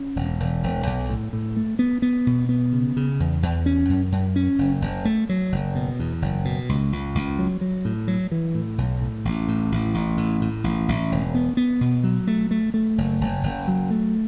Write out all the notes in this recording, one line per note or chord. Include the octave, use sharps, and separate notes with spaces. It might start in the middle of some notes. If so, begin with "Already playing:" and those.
Already playing: C#4
E1
E1
E1
B1
A2
A2
A3
B3
B3
B2
B3
C#3
C#3
E2
E2
C#4
F#2
F#2
C#4
F#1
F#1
A3
F#3
F#1
B2
E2
F#1
B2
C#2
C#2
C#2
F#3
F#3
A2
F#3
E3
A2
B1
A2
A1
A2
A1
A1
A2
A2
A1
A1
E1
B3
B3
B2
F#3
A3
A3
A3
F#1
F#1
F#1
F#3
A3